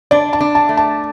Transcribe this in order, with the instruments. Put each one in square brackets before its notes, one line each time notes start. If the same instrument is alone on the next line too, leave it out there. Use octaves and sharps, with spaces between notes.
[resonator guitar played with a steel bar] D4 [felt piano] D5
[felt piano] A5
[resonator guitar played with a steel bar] D4
[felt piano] A5
[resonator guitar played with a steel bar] A3
[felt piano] A5